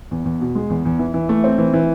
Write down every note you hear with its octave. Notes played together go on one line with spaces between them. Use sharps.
E2
E2
B2
G#3
E2
E2
E3
E3
A3
C4
E3
E3